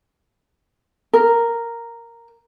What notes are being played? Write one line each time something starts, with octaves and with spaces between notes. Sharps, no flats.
A#4